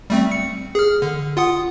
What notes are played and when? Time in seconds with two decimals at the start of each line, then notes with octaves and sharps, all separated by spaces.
0.10 G3 A3 C4
0.31 C#7
0.75 G#4 F6
1.02 D3
1.37 F4 F#5 D#6